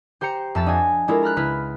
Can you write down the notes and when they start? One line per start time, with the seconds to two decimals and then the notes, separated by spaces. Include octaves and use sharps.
0.21 G4 C5 G5 A#5 C#7
0.55 F2 E5 A5 E6 A6
0.66 D4 D#5 F#5 G#5
1.08 G#3 D4 E4 F4 A4 A#4
1.23 A#5 B5 F6 F#6
1.36 C#2 E4 B4 F6 B6